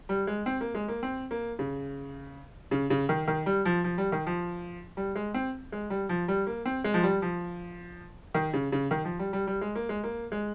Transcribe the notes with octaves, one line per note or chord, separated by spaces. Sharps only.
G3
G#3
C4
A#3
G#3
A#3
C4
A#3
C#3
C#3
C#3
D#3
D#3
G3
F3
F3
G3
D#3
F3
G3
G#3
C4
G#3
G3
F3
G3
A#3
C4
G#3
F3
G3
F3
D#3
C#3
C#3
D#3
F3
G3
G3
G3
G#3
A#3
G#3
A#3
G#3